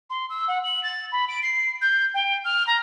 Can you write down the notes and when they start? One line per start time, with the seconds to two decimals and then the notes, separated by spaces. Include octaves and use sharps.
0.10 C6
0.29 E6
0.47 F#5
0.63 F#7
0.83 A6
1.11 B5
1.28 D7
1.42 C7
1.81 G6
2.14 G5
2.44 F6
2.67 A#5